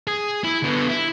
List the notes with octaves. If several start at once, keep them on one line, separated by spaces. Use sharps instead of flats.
G#4
E4
D3 B3
E4